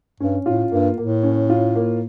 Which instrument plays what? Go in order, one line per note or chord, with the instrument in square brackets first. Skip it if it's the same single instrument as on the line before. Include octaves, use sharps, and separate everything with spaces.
[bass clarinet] G2 [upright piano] C#4
[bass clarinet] A2 [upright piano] F4
[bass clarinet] G2 [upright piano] A#3
[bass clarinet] A2 [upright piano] A#3
[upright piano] C#4
F4
A#3